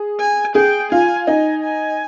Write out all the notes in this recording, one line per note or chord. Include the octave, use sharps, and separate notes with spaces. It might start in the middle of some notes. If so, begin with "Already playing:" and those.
Already playing: G#4
G#5
G#4 G5
F4 G#5
D#4 G#5
G#5